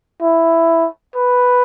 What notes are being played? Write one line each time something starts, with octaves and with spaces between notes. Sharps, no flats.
E4
B4